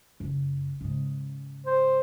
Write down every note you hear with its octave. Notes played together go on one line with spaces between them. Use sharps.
F#1
G#2 C#3
C5